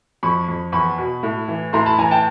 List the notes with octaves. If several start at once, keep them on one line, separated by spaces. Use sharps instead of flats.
F2 B5 C#6
F2
E2 B5 C#6
B2
A2
E3
A2 A#5 C6
A5 B5
E3 G#5 A#5
G5 A5